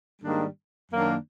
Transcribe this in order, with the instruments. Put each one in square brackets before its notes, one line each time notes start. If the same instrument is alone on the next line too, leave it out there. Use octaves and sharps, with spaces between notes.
[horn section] G#2 D#3 G3 A#3 D4
F#2 D#3 F#3 A#3 D4